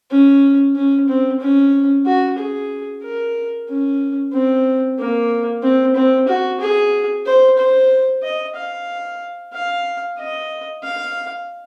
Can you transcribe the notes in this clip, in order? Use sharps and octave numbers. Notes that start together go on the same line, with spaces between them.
C#4
C#4
C4
C#4
F#4
G#4
A#4
C#4
C4
A#3
C4
C4
F#4
G#4
C5
C5
D#5
F5
F5
D#5
F5